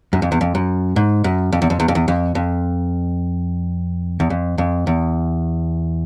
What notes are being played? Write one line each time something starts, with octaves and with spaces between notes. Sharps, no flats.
F#2
F2
E2
F2
F#2
G#2
F#2
F2
E2
F2
E2
F2
E2
F2
F2
E2
F2
F2
E2